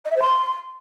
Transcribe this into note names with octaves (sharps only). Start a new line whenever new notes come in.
D#5
E5
C5
C6